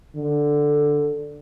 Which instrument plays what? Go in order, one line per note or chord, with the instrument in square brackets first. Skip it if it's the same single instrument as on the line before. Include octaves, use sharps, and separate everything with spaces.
[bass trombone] D3